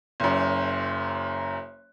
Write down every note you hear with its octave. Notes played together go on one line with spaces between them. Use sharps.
F#1 F#2